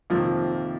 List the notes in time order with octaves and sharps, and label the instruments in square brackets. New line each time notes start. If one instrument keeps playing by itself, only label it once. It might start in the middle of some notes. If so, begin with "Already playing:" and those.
[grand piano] F2 C3 D#3 A#3 [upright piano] F3